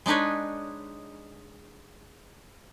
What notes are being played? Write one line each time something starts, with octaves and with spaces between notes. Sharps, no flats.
G#3 D4 D#4 B4 C#5